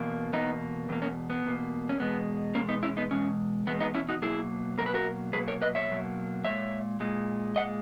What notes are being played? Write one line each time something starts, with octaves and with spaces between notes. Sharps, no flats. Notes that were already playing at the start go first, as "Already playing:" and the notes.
Already playing: E2 B2 A#3
E2 B2 A#3 B3 D#4
E2 B2 A#3
A#3 C#4
B3
E2 B2 A#3
C#4
E2 B2 G#3 B3
E2 B2 G#3 A#3 C#4
B3 D#4
C#4 E4
B3 D#4
E2 B2 G#3 C#4
E2 B2 G#3 B3
B3 D#4
C#4 E4
D#4 F#4
B2 F#3 A#3 E4 G#4
B2 F#3 A#3 A#4
B4
F#4 A#4
B2 F#3 A#3 G#4 B4
A#4 C#5
B4 D#5
C#5 E5
B2 F#3 A#3
A#2 G#3 C#5 E5
A#2 G#3
A#2 G#3 D#5 F#5